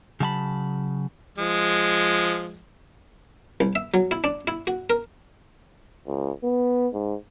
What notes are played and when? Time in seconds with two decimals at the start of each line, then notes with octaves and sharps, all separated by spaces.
0.20 C#3 F#3 A5 B5
1.38 F3 G#3
3.60 C2
3.75 E5
3.94 F#3
4.11 E4
4.24 D4
4.47 E4
4.67 F#4
4.90 A#4
6.07 C#2
6.44 B3
6.94 G#2